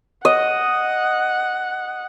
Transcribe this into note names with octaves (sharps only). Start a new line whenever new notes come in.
D#5 F#5